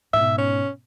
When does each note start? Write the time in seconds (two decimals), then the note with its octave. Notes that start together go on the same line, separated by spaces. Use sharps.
0.13 G#2 B2 E5
0.38 C#4